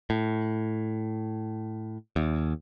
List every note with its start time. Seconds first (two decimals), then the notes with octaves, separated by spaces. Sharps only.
0.10 A2
2.16 D#2